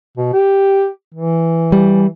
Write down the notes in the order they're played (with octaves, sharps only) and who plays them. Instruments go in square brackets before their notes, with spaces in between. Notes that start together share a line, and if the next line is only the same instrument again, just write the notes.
[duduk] B2
G4
E3
[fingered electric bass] G3